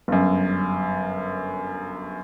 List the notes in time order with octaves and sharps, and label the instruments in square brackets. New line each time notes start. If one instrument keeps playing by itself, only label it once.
[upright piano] G1 F#2